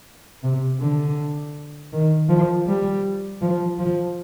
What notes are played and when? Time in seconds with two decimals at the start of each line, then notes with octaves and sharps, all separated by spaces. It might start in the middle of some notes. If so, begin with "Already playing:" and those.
0.43 C3
0.80 D3
1.93 D#3
2.29 F3
2.67 G3
3.42 F3
3.79 F3